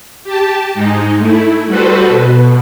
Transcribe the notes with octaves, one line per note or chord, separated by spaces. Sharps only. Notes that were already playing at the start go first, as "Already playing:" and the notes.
G4 A5
G#2 G#3 D#4
A3 E4
G3 F#4 A4 B4 C5
B2